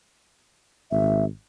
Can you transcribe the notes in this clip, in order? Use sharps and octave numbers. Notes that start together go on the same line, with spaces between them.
G#1 E5